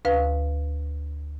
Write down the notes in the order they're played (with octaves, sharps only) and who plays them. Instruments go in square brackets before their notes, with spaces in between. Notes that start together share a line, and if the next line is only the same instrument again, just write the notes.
[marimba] D2 B4 F5